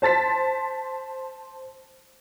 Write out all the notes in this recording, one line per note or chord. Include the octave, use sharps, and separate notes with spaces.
C5 A5 A6 B6